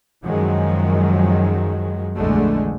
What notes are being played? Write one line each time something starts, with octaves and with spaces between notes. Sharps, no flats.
F#2 D#3 F3 F#3 G#3
A#1 E2 D3 G#3 A3